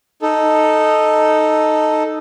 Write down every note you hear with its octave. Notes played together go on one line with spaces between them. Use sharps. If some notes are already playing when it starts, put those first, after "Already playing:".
D#4 A4